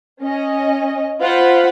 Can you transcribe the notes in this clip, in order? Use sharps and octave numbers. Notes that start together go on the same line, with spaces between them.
C#4 D#5
F4 C5 F#5 B5